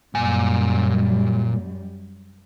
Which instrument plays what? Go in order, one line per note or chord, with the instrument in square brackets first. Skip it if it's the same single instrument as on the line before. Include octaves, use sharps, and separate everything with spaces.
[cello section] F#2 G3 [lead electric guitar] A#2 G#5